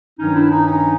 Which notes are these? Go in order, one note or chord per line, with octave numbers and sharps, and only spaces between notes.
G2 D#3 F#3 C#4 D#4
D4 E4
C#4 D#4
C#4 D#4